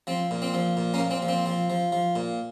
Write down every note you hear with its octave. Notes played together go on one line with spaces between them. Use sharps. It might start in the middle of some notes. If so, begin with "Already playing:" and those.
F3 C4
A#2
C4
F3
A#2
A#3 C#4
A#2
C4
F3
C4
F3
F3
F3
A#2